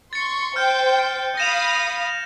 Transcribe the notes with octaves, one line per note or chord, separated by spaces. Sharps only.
C6 C#6 A6 C#7
C5 G5 F6 G6
F5 B5 D#6 A#6 E7 F7